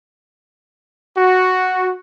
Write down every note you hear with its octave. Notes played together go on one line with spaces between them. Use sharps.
F#4